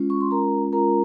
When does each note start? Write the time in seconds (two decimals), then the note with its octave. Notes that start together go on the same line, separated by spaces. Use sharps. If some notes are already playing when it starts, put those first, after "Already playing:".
Already playing: G#3 C#4 F4
0.10 C#6
0.21 C6
0.31 A#4 A#5
0.72 G#3 C#4 F4 A#4 A#5